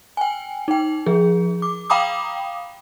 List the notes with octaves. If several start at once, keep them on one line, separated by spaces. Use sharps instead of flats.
G5 G#5
D#4 G5
F3 G#4
D6
F5 G5 A#5 B5 D6 D#6